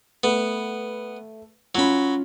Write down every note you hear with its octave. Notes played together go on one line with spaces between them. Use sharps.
A3 B3
F#3 C#4 F4 B5